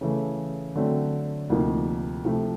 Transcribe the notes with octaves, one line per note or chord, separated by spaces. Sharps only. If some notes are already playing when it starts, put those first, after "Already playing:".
C#3 E3 A3
D3 F#3 A3 C4
D2 C3 F3 A#3 D#4
C3 F3 A3